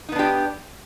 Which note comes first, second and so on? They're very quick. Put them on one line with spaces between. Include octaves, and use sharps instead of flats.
D#4 B3 D4 G4